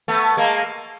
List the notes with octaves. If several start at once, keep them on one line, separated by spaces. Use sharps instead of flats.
A3 B3
G#3 A#3